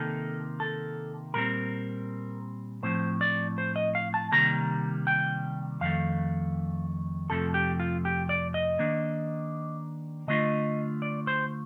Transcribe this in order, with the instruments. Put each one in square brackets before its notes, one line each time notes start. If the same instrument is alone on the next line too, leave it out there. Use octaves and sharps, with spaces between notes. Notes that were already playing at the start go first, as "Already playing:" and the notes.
Already playing: [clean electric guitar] C3 D#3 A#3 A4
A4
A#2 G3 C4 A#4
A2 F3 C4 C5
D5
C5
D#5
F5
A5
C3 D#3 G3 A#3 A#5
G5
F2 D#3 A3 F5
F2 C3 F3 A3 A4
G4
F4
G4
D5
D#5
D#3 A#3 D4
D3 A3 D4 F4 D#5
D5
C5